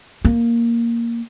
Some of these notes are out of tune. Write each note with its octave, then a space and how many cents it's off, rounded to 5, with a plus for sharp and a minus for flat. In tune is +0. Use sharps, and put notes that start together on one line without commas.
A#3 +0